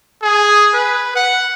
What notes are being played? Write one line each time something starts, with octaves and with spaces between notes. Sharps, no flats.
G#4
B4
F#5